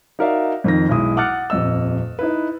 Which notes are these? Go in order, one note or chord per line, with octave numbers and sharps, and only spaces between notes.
D#4 F#4 A#4 D5 E5 F5
F2 D#3 A#6
B1 G#3 E4 D#6
F#5 D6 F6 F#6 A6 C#7
D#1 F2 D#5 E6
D#4 E4 B4